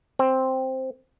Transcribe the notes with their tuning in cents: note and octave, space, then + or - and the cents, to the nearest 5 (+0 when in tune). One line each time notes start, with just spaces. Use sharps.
C4 +5